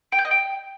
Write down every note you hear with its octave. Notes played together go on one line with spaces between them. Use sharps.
G5
G6
D#5
G5